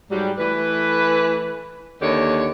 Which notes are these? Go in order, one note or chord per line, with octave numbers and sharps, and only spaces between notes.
G#2 F#3 G3
E3 A3 B4
D#2 D3 D#4 G4 C#5